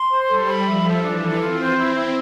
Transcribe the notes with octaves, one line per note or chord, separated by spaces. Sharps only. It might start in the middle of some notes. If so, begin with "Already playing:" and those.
Already playing: C6
C5
G3 A4
B5
F3 E5
A4
E3 D4
A4
C4 F4
C5
C4 E4
E4